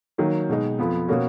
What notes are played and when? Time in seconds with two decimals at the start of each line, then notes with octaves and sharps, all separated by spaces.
0.18 D#3 F#3 A#3 D#4
0.49 B2 G#3 D#4
0.79 F2 F3 B3
1.08 B2 A#3 C#4 F#4